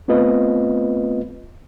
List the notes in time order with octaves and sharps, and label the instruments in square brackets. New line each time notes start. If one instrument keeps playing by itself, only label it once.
[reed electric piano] A3 B3 C4 F4 B4 D#5